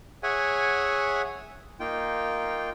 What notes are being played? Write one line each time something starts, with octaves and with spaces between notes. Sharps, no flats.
G#4 C#5 E5 F#5 G#5
A#3 D#4 F4 G5